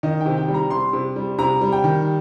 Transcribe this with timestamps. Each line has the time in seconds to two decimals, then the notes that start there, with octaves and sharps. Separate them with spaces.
0.03 D#3 D#5
0.21 G5
0.26 C3
0.37 G5
0.48 G3
0.54 A#5
0.70 C3 C6
0.93 C3
1.16 G3
1.38 C3 A#5
1.61 G3
1.72 G5
1.84 D#3